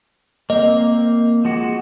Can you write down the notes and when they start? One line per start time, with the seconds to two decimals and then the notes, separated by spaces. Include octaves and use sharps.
0.50 A#3 C4 D#5
1.45 F3 G#3 F#4